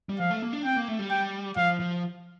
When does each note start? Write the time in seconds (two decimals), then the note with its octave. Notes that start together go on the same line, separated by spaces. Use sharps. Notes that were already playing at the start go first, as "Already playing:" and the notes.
0.09 G3
0.20 F3 F5
0.31 A3
0.42 A#3
0.53 D4
0.65 C4 G5
0.76 A#3
0.88 A3
0.99 G3
1.10 G5
1.57 F3 F5
1.80 F3